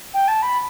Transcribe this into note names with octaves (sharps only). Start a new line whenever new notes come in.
G5
A5
B5